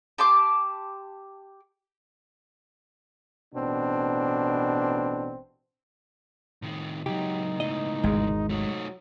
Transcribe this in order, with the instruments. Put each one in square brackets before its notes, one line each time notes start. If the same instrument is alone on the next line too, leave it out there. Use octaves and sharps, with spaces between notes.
[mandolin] G4 A5 C6 D6
[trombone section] A1 B2 C4 D4
[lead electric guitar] A2 D#3
[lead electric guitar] C#2 F#3 [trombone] D#4 [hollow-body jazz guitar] G4
[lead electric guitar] C#2 A2 [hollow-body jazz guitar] D#5
[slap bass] G#1 E2 [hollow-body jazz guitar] G#3
[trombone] F#3 [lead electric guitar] A3 D#4